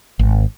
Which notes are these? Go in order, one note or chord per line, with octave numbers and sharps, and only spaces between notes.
G#1